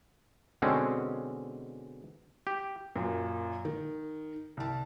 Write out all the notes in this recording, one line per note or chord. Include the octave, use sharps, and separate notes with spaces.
B2 D3 G#3 C4 C#4
G4
F#2 A#2
D#3
C2 A5